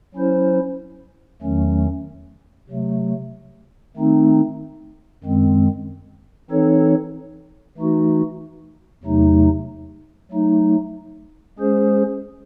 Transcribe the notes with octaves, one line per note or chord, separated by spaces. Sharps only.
F#3 C#4 E4 C5
E2 D#3 F#3 A3 C#4
C3 F#3 A3
D#3 A3 C4 D#4
F#2 D#3 G#3 C4
E3 C4 D#4 A4 C#5
E3 A3 D#4 F#4
E2 C3 F#3 A3 D#4
F#3 A3 D#4
G#3 C#4 G#4 C5